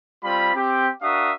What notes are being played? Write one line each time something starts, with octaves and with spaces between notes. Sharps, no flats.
G3 C4 F4 B5
C4 G4
D4 F#4 A#4 E5 F5 D#6